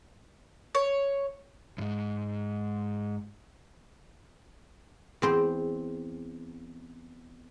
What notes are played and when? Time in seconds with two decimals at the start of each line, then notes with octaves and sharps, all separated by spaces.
0.75 C#5
1.78 F2 G#2
5.22 E2 C4 C5